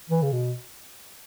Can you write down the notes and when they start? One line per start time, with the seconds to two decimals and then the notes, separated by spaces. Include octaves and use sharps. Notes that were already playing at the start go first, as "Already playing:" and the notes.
0.10 E3
0.23 C#3
0.33 B2